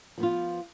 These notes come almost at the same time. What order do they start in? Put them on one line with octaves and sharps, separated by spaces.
F3 B3 F4